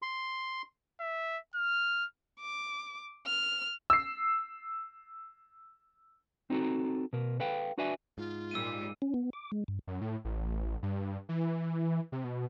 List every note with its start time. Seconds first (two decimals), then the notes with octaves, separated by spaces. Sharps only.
0.02 C6
1.00 E5
1.55 F6
2.40 D6
3.27 F6
3.90 E6 C7
6.50 C4 D#4 F#4 A4 A#5
7.13 B2 A#4
7.40 A4 B4 F5 G5
7.78 D4 F#4 B4 D5 E5 G#5
8.18 G#2 F4
8.51 A#2 G3 G#3 E6 D#7
9.02 C#4
9.14 B3
9.33 D6
9.52 G#3
9.68 G2
9.87 F#2
10.01 A2
10.25 A1
10.83 G2
11.29 E3
12.12 C3
12.24 B2